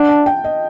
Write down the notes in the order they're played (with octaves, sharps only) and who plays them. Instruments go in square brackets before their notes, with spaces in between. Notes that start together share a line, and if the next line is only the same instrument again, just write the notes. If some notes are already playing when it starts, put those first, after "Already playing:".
Already playing: [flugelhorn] D4 [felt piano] F#5
[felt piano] A5
G5
D#5